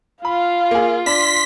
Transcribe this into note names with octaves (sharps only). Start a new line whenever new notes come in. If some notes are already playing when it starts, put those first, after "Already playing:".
F4 F5 B5
A#3 G#4
D4 C6 B6